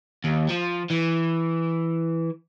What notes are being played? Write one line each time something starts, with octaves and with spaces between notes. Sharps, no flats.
D#2
F3
E3